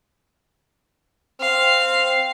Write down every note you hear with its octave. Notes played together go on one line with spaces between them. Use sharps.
C4 F5